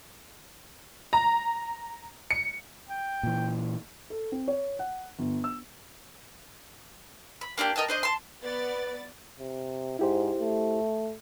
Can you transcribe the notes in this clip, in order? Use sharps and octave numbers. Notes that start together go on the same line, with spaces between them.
A#5
C#7
G5
A#2 E3
A4
C4
C#5
F#5
G1
E6
B5
A#3 D4 F4 G4
A#4 D#5 G5 A5
D4 C5 D#5
A5 C6
B3 B4 D5 A6
C3
G#2 E4 G4 C5
A3